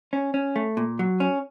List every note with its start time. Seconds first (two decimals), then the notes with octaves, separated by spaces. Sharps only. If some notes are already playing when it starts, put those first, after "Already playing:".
0.13 C#4
0.34 C#4
0.56 A3
0.77 A#2
0.99 F#3
1.20 C#4